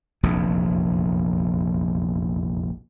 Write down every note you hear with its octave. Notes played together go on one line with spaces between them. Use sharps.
F1 A#1 E2